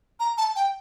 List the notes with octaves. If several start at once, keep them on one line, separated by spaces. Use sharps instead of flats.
A#5
A5
G5